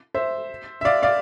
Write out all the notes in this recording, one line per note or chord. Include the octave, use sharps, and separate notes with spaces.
C5 E5
E5
D5 F5
D5 F5